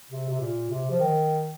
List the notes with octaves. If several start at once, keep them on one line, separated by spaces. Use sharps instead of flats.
C3
C3
A#2
C3
F3
D#3